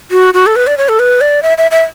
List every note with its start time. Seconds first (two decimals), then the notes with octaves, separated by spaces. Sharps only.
0.11 F#4
0.34 F#4
0.47 A4
0.56 B4
0.67 D5
0.78 C#5
0.89 A4
0.99 B4
1.21 D5
1.43 E5
1.58 E5
1.71 E5